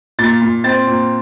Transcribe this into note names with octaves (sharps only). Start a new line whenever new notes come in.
A#2 A6
A#2
C4 A6
A#2